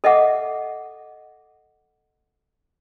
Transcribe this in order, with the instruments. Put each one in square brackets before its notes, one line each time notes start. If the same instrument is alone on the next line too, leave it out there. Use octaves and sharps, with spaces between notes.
[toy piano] A4 D#5 E5 F#5 D6